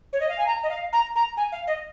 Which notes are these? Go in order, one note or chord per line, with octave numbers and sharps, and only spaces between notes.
C#5
D#5
F5
G#5
A#5
D#5
F5
A#5
A#5
G#5
F5
D#5